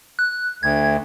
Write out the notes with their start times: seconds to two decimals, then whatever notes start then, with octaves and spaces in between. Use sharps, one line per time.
0.19 F#6
0.63 D2 G#6